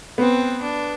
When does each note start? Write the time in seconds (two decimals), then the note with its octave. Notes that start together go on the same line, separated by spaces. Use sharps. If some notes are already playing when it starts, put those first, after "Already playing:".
0.18 B3 C4
0.63 D4